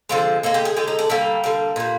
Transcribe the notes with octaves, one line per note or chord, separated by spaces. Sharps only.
D3 F3 G#3 C4
D3 G#3 A#3
G4
G#4
D3 G#3 G4
D#4
D4
D3 G3 A#3
D3 G3
A#2 G3